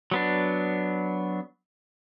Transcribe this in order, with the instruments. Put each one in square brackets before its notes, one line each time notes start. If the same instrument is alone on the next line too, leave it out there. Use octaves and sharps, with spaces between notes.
[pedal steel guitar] F#3 B3 D4